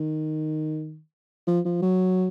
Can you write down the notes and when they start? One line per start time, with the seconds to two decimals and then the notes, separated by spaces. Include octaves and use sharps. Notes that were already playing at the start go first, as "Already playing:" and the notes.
Already playing: D#3
1.47 F3
1.65 F3
1.82 F#3